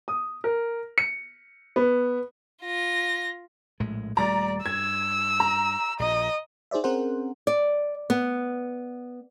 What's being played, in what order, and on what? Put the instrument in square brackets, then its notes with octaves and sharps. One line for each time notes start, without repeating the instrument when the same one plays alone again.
[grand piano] D#6
A#4
C#7
B3
[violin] F4 A#6
[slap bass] A#1 A2 G#3
[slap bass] D#1 G3 A3 [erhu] D5 [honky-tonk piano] A#5 A6
[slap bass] G2 [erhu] E6 [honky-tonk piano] G#6
[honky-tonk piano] A#5
[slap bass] A#1 [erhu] D#5
[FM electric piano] D#4 G#4 C5 D5 E5
C4 C#4 G#4 A#4 C5 F#5
[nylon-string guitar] D5
B3